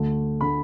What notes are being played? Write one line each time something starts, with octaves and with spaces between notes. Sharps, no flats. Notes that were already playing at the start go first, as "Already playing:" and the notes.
Already playing: D2 D3 A3
D3 A3 B5